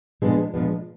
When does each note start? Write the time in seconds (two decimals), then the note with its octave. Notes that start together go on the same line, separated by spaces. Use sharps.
0.22 A#2 F3 G#3 B3 D4
0.54 A#2 F3 G#3 B3 D4